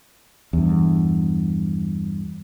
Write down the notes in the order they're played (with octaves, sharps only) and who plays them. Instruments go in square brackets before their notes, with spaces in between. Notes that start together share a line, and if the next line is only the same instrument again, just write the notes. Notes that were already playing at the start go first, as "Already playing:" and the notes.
[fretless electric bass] E2 G2